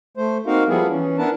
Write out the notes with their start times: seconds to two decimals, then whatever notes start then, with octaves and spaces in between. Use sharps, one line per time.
0.17 A3 C5
0.46 A#3 C4 D#4 F#4 A#4 F5
0.68 F3 G3 A#3 B3 E4 G#4
0.89 E3 C#4
1.18 B3 D4 E4 A#4 B4 A5